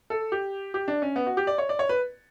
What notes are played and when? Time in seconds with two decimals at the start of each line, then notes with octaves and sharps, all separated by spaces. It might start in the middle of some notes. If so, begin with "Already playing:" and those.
0.10 A4
0.32 G4
0.74 G4
0.88 D4
1.02 C#4
1.16 B3
1.27 F#4
1.37 G4
1.47 D5
1.58 C#5
1.69 D5
1.79 C#5
1.89 B4